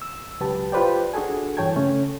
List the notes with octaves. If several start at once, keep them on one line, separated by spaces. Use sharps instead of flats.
E6
C#2 F#3 G4 B4 A5
F4 G4 B4 C5 D5 G5
D4 F#4 G#4 A4 G#5
G2 E3 C#5 G5 A5 G#6
C#3 A3 C#4